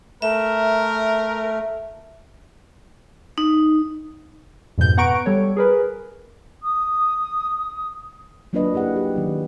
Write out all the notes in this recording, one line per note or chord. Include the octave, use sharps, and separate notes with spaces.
A3 A#4 E5
D#4
F2 G#2 B2 G6
B3 F#5 A#5 C#6 D7
G3 A4 C#5
G#4 A#4 B4
D#6
F#3 A#3 D4 F4 B4 D#5
E4 G4 G#4 F#5
G4
D#3 F#3 B3